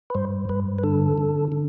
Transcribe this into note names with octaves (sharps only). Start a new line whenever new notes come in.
B4
G2 C5
G2 B4
B4
D3 A4
D3
D3